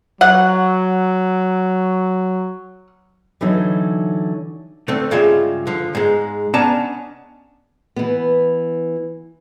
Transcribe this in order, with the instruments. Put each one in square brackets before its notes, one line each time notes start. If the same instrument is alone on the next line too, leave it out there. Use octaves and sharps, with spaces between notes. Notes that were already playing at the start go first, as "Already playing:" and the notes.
[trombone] F#3 [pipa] F#5
[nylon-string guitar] D3 E3 F#3 D#4
[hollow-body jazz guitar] D3 A3 C4
G2 C#3 G#3 F4 E5
D3 F3
G#2 G#3
B3 C#4 D4 D#5 A5 A#5
[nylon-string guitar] E3 B3